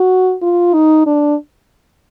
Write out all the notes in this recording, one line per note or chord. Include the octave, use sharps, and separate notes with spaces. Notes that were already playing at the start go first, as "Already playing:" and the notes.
Already playing: F#4
F4
D#4
D4